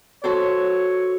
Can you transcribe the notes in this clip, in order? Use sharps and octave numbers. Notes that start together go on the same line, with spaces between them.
F#4 A4 C5 C#5